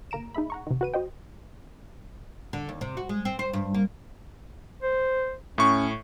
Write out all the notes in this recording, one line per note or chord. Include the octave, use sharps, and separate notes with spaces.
G1 A#3 A#5 D7 E7
D#4 G#4 E5 B5
F#5 A#5 C#6
C3 D#3
F#4 B4 D#7
F#4 C5 D#5 G5
D3
D#2
C3
F#4
G#3
C4
C5
G2
A#3
C5
A2 C#4 C#6